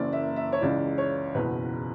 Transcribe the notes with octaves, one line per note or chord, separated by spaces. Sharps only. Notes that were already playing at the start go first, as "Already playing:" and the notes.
Already playing: F#1 F#2 E3 A#3 D5
E5
E5
C#5
C#2 C#3 E3 D5
C#5
F#1 E2 B2 B4